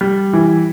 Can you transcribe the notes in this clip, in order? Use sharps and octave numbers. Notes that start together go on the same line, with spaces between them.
G3
E3